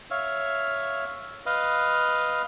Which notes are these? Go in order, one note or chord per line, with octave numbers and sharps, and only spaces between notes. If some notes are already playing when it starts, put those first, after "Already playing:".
C#5 E5 F5
B4 D#5 F5